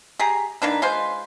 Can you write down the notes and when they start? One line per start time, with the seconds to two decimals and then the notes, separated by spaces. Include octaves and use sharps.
0.19 G4 G#4 A#5
0.62 D#3 A#3 D4 B4
0.82 G#3 F4 B4 C5